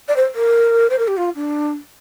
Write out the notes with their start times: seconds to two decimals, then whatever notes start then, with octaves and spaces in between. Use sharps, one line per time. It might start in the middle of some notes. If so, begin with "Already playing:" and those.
0.08 D5
0.16 C5
0.35 A#4
0.90 C5
0.99 A#4
1.08 G4
1.17 F4
1.35 D4